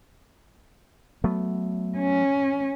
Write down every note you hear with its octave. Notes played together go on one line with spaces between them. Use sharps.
F#3 A3 B3
C#4